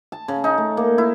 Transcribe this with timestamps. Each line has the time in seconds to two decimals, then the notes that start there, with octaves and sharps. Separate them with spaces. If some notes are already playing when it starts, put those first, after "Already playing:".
0.12 A5
0.28 C#3
0.44 D#4
0.58 A3
0.77 A#3
0.98 E4